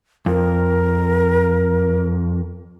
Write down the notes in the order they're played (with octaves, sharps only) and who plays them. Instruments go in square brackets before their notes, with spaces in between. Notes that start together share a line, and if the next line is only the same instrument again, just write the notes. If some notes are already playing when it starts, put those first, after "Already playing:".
[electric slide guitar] F2 [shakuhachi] A#4